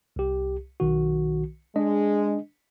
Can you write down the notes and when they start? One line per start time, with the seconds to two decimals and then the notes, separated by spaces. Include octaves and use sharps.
0.16 C2 G4
0.80 B1 D#3 F#4
1.76 G#3 D4 D#5